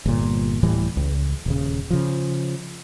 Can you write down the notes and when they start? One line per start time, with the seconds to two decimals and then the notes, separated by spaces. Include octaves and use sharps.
0.05 G1 A#2
0.63 D1 A2 E3 G3
0.97 C#2
1.46 D#1 C#3
1.90 C#3 F3